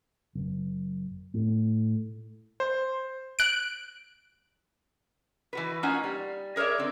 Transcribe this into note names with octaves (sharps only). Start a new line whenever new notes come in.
F#1
A2
C5
F#6 D7
E3 F#4 B4
A#3 C#4 D#4 F4 F#5 G#5
G3
G#4 A#4 C#5 D5 E5
D3 C4